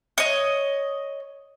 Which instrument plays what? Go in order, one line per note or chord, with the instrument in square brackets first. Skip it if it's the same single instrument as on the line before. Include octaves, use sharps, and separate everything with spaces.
[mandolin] C#5 D#5